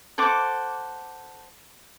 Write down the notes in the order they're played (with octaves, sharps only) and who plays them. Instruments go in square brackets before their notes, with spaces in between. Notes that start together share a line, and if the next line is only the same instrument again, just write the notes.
[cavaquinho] A4 C5 F#5 D6